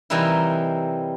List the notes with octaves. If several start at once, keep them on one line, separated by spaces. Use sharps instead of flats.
C3 E3 G3 A#3 D#4 E4